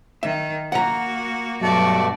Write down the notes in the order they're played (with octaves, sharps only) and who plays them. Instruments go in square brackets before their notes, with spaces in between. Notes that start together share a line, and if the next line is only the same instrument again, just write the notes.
[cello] D#3 [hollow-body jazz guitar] E5
[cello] A#3 F#4 [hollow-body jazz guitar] F#5 A#5
[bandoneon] G2 B2 A3 [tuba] F#3 [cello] F#4 D5